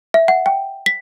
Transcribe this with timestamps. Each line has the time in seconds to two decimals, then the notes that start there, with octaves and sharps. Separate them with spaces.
0.14 E5
0.28 F#5
0.46 G5
0.86 B6